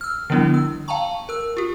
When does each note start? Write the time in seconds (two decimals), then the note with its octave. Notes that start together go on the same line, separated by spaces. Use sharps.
0.01 E6 F6
0.30 D3 F3 G3 B3 D4 E4
0.54 E6
0.88 F5 G5 A5 A#5 C#6
1.29 A#4 E6
1.57 F4 G4